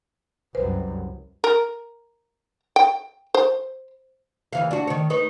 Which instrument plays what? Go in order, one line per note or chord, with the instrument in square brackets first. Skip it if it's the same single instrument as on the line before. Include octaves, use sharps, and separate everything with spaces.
[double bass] C2 F#2 [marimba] B4 C5
[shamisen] A#4
G5
C5
[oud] D#2 E3 F5
D4 F#4
D#3 C#5
D#4 B4 C#5